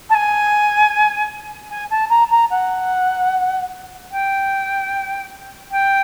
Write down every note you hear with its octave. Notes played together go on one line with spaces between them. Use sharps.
A5
G#5
G#5
A5
A#5
A#5
F#5
G5
G5